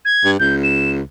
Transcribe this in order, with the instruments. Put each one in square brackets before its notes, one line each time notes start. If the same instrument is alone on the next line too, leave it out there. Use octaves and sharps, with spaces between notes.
[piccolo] G#6
[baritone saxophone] G2
[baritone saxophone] C#2 [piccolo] G6
[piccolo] E7